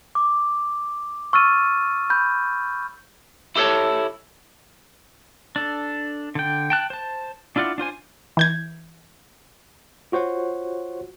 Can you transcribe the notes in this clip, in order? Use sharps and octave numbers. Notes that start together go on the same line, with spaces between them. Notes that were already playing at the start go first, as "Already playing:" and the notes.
D6
C#6 E6 F6 A6 D#7
B5 G6
E4 G4 A4 B4 C#5 A5
D4 A4
D3 G5
G5 A5 F#6
C5 A5
D4 E4 F4 D5 F#5
D4 F4 C5 G#5
E3 G6 G#6
F4 F#4 C5 C#5 F#5